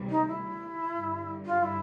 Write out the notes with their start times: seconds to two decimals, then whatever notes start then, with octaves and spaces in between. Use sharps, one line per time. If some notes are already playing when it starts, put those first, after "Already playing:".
Already playing: D2 C3 D#3 G3
0.09 D#4
0.26 E4
0.95 G2 D3 G3
1.45 F4
1.63 E4